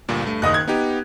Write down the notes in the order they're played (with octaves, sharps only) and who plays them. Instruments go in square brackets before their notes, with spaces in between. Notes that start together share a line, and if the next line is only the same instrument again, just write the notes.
[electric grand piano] D2 G2 A#2
G2 A3
[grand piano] F#1 D#5 D#6 [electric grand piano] D#3 F#6
[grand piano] G#6
[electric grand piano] B3 D#4 G4